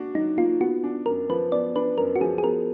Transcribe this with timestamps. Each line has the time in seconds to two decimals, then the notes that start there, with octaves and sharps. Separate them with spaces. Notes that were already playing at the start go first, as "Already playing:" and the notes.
Already playing: A#3 D4 F#4
0.15 F#3 D#4
0.37 A#3 F4
0.60 B3 F#4
0.83 D4
1.06 F#2 A#4
1.29 F3 B4
1.52 B3 D5
1.75 D4 B4
1.98 F#2 A#4
2.16 F#4
2.21 F3 G#4
2.38 G#4
2.44 B3 A#4